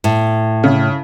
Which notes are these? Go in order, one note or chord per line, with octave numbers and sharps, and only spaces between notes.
A2
C#3